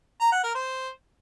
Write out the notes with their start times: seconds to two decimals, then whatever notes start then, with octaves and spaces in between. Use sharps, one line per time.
0.20 A#5
0.32 F#5
0.43 A#4
0.55 C5